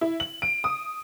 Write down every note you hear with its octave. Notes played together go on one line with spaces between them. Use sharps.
E4
F#7
D7
D#6